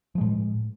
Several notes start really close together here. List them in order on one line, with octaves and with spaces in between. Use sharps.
F3 G#3 A2